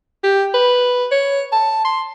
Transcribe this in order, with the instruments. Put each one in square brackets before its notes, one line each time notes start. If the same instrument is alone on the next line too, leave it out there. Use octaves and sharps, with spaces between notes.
[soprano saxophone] G4
B4
C#5
A5
C6